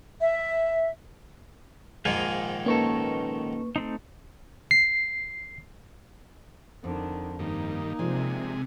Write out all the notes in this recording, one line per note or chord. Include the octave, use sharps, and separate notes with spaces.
E5
A#1 G#2 D#3 F5 G#5
A#3 C#4 D#4 A4 B4 C#6
A3 C4 D#4
C7
F2 D3 D#3
G2 D#3 A#3 D#4
C3 F3 G#3 D5